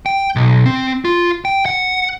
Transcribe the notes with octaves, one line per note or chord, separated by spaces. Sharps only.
G5
B1
C4
F4
G5
F#5